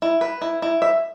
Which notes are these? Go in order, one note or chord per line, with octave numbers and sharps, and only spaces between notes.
E4
B4
E4
E4
E5